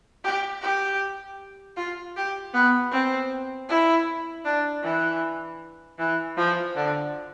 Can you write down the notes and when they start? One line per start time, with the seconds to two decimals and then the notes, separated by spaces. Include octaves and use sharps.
0.24 G4
0.62 G4
1.77 F4
2.16 G4
2.54 B3
2.92 C4
3.69 E4
4.45 D4
4.83 E3
5.99 E3
6.37 F3
6.75 D3